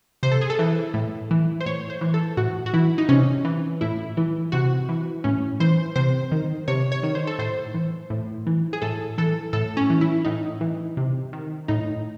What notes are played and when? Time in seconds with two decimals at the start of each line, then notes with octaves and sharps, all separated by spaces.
0.23 C3 C5
0.31 A4
0.41 G#4
0.50 A4
0.59 E3
0.94 A2
1.31 E3
1.60 C5
1.66 A2 C#5
1.90 C5
2.01 E3
2.14 A4
2.37 A2 F#4
2.66 F#4
2.73 E3 E4
2.98 D#4
3.09 C3 C#4
3.45 E3
3.81 A2 E4
4.17 E3
4.52 C3 F#4
4.89 E3
5.24 A2 C#4
5.60 E3 C5
5.96 C3 C5
6.32 D#3
6.68 C3 C#5
6.92 C#5
7.03 D#3
7.15 C5
7.27 A4
7.39 A2 C5
7.74 E3
8.10 A2
8.47 E3
8.73 G#4
8.82 A2 A4
9.18 E3 A4
9.53 A2 A4
9.77 C#4
9.90 E3
10.01 E4
10.25 A2 D#4
10.61 E3
10.97 C3
11.33 D#3
11.68 A2 D#4